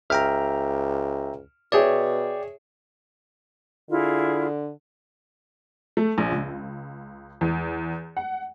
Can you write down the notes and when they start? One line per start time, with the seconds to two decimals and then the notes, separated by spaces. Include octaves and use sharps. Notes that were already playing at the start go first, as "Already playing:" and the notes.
0.10 C#2 E5 G5 A#5 F6
1.72 B2 G#4 C#5 D5 E5 G5
3.90 D3 E4 F4 G#4
5.97 A3
6.18 A#1
6.32 C#2
7.41 E2
8.17 F#5